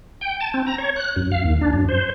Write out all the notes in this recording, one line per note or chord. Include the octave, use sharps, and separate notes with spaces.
G5
A5
C4
A#5
C#5
F#6
F#2
F5
D#2
D4
F#2
C5